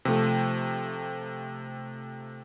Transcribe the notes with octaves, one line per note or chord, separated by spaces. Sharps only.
C3 F3 A3